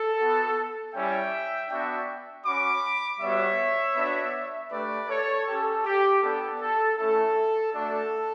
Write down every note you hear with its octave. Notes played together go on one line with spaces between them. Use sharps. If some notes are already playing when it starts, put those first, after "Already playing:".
Already playing: A4
B3 F#4
G3 C#4 E4 E5 G5
B3 D4 F#4 E5 G5
C#4 F#4 B5 D6
G3 B3 F#4 C#5 E5
B3 D4 F#4
A3 D4 G4 B4 D5
A4 C#5
C#4 G4 A4
G4
B3 D4 G4 A4
A4
A3 C#4 E4 A4
A3 D4 F#4 A4